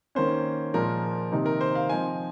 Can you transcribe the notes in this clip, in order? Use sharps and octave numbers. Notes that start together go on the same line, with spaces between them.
D#3 A#3 C#4 C5
A#2 F3 G#3 A#4
C3 D#3 A#3 D#4
A#4
C5
F5
F3 C4 D#4 G#5